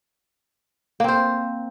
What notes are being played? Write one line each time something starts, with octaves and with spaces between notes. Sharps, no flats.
A#3 C4 C5